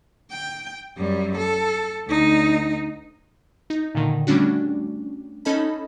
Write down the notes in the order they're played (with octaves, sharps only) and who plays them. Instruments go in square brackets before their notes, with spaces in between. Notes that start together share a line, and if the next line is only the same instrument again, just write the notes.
[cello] G5
F#2 G3
A4
D2 D#4
[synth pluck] D#4
A#2 D3 D#3
G3 A3 C#4 D4 F#4
C#4 D#4 A4 D#5 A5 B5